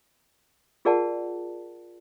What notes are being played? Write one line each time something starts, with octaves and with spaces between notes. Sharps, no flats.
F4 G#4 A#4 D5 F#5 A5